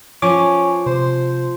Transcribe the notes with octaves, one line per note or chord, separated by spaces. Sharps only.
F3 C#4 D6
C3 C5